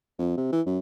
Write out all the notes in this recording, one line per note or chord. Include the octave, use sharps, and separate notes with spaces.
F2
C3
E3
F#2